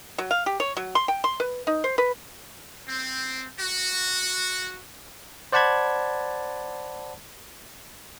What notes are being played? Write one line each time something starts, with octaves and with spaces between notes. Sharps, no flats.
F#3
F5
G4
C#5
F#3
C6
G5
C6
B4
D#4
C5
B4
C4
F#4
C5 D5 F#5 A5 B5 G#6